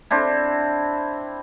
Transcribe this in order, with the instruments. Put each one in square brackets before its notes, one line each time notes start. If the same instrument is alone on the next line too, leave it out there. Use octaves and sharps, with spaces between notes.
[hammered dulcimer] C4 D4 E4